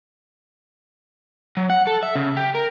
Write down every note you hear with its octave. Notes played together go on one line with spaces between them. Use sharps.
F#3
F#5
A4
E5
C#3
G4
A#4